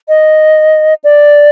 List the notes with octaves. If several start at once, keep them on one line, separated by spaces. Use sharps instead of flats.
D#5
D5